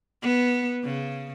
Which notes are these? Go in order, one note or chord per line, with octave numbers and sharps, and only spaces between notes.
B3
C#3